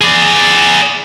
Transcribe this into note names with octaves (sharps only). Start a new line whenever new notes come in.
G#4 D5